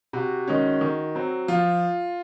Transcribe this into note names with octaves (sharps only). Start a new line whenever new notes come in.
C3 F#4
D#3 G#3 C#4
D#3
F#3 C4
F3 F4